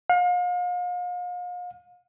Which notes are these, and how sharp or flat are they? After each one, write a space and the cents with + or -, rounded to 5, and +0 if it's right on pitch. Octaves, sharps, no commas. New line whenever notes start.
F5 +40